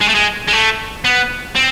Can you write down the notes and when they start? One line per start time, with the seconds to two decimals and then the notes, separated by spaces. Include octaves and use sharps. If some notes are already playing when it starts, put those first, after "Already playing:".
0.01 G#3
0.09 A3
0.15 G#3
0.48 G#3
0.52 A3
1.04 B3
1.56 C4